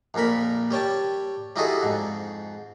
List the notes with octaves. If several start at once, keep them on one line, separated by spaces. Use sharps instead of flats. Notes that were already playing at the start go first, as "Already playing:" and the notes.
A#1 F2 A#2 A#4 B5
G3 C#5 G5 A5
G3 D#4 E4 F#4 G#4 A4
F2 G#2